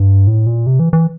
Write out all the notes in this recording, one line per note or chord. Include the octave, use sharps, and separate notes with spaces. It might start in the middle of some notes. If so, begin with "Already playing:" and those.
Already playing: G2
A2
A#2
C3
E3
E3